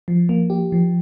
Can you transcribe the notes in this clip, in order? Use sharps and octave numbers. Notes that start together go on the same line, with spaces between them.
F3
A#3
G4
F3